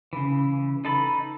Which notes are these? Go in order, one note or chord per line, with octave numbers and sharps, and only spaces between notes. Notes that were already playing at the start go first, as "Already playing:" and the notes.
C#3 E3
D#4 A4 A5 B5